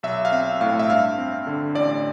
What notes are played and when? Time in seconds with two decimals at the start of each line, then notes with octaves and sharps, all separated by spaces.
0.03 B1 E5
0.25 F5
0.32 C4 E5
0.61 A2 F5
0.79 E5
0.89 G2 F5
1.18 C4
1.47 D3
1.74 A1 D5